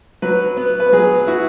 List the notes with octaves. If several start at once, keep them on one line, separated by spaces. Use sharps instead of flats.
F#3 B4
B3
B4
F#3 G#4
E4 F#4